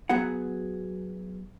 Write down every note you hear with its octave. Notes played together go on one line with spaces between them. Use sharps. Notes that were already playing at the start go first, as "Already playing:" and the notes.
F#3 B3 F#4 G#4 F#5